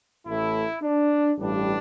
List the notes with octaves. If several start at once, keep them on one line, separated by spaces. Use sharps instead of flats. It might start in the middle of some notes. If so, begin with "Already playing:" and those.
A1 A2 A3 E4
D4
A1 G2 G3 D4